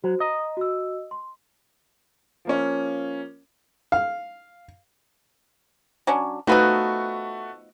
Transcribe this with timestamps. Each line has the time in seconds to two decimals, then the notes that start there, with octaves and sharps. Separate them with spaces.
0.04 F#3 F#4 C5
0.20 D#5 A#5
0.57 F#4 E6
1.11 C6
2.45 F3 A#3 C#4
3.92 F5
6.07 F#3 C#4 D4
6.47 F3 A3 B3 D#4 F#4 B4